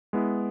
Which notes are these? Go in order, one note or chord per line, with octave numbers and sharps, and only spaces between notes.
G#3 B3 E4